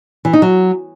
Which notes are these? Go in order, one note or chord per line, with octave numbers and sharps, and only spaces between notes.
E3
D#4
F#3